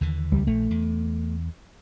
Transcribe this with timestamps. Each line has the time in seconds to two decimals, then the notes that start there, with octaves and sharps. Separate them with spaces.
0.01 D#2 D3 E3
0.32 C#2 G3
0.47 A#1 A3
0.71 E2